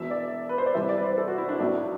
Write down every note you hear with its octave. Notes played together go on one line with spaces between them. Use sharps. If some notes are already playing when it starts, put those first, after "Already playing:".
Already playing: E1 E2 B2 E5
D5
B4
C5
D5
C2 C3 E3 G3 E5
D5
B4
C5
A4
F#4
E4
D4
B1 A2 F#3 D4